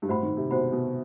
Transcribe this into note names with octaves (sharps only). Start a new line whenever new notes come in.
G2
A2 F#4 C5 F#5 B5
D#3
C3
B2 F#4 C5 F#5 B5
B2